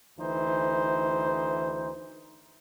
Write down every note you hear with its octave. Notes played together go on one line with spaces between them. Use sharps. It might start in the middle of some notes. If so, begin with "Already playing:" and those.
D2 E3 D#4 C5